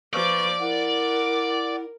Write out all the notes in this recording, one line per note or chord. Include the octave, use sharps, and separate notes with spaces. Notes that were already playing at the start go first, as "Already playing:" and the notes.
F3 B4 D5 C#6 D6
E4 A#4 F#5